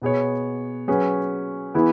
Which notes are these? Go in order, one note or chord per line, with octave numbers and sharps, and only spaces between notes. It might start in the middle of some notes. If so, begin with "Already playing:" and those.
B2 B3 G#4 C#5
F#3 C#4 G#4 B4
E3 B3 E4 G#4